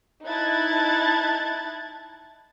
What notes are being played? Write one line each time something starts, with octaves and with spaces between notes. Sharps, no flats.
D#4 E4 A5 F#6 G#6 A6